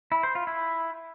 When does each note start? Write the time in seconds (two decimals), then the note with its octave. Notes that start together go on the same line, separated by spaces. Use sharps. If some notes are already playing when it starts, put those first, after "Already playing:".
0.12 E4
0.23 C5
0.35 F4
0.47 E4